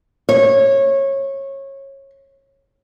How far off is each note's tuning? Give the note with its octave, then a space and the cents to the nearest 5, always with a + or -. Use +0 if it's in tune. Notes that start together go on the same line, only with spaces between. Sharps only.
C#5 -20